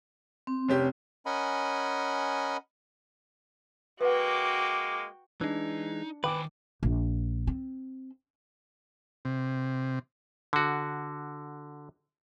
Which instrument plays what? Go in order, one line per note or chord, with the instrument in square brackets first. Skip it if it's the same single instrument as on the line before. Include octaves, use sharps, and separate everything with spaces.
[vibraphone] C4
[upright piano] F1 C#4 G4
[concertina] C#4 A#4 D#5 F#5 G#5 B5
[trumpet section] G#3 A#3 D6 [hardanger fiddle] F#4 G5 [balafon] B4 F#5
[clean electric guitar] E3 G#3 [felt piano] D4 [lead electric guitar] D#4
[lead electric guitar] D#3 G#5 [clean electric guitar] B4 [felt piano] G5 D6
[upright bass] A#1
C4
[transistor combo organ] C3
[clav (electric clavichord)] D3 F#4